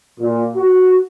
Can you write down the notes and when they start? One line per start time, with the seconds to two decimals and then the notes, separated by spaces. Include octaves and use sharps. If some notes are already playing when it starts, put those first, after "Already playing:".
0.20 A#2
0.56 F#4